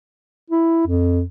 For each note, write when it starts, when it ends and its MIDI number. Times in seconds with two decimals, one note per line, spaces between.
0.50 0.83 64
0.86 1.22 41